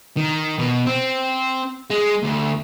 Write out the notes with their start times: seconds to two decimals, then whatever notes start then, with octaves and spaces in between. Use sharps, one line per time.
0.17 D#3
0.59 B2
0.86 C4
1.90 G#3
2.23 D2